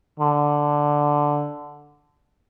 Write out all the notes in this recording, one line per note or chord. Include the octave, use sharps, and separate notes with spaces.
D3